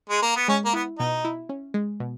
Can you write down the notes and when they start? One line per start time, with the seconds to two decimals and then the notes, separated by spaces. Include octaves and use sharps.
0.10 G#3
0.22 A#3
0.36 B3
0.48 G#3 C#4
0.65 A#3
0.73 B3 E4
0.99 B2 D#4
1.25 E4
1.49 C#4
1.74 G#3
2.00 B2